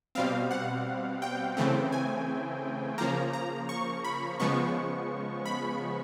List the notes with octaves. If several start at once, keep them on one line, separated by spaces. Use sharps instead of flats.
B2 G3 C4 F5
F#5
G5
C#3 E3 A3 C4
G#5
C#3 F3 A#3 A#5
A#5
C#6
B5
C#3 F3 G#3 B3 C#6
B5